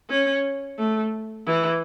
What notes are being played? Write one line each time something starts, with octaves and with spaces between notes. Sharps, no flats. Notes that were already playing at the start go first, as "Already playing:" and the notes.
C#4
A3
E3